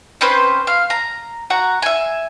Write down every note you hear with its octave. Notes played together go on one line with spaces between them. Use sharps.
C4 C#4 B4 C5
F5
A#5
F#4 F#5 A#5
E5 G#5